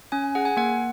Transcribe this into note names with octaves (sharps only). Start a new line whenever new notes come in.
C#4 G#5
G#5
G#4 F#5
G#5
A#3 F#5